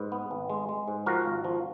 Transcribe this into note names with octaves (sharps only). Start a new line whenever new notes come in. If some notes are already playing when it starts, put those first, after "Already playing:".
Already playing: G#2 B4
B3
G#1
G#3
G#3
G#2
F3 F#4 A#4
G#1
F3